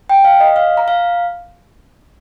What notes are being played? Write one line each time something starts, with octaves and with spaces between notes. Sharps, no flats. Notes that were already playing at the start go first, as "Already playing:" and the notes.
G5
F5
D#5
F5
A#5
F5